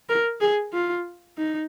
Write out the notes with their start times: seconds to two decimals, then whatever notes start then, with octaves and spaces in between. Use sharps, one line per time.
0.09 A#4
0.41 G#4
0.73 F4
1.38 D#4